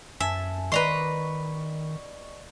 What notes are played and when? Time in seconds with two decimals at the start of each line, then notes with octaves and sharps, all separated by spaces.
0.20 F#2 E5 G#5 A5
0.72 D#3 B4 D5 D#5 A#5 C6 C#6